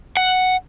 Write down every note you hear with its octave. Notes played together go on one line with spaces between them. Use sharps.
F#5